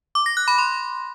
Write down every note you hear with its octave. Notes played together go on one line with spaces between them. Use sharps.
D6
A#6
F#6
B5
C6